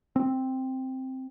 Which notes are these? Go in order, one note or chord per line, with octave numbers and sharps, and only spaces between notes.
C4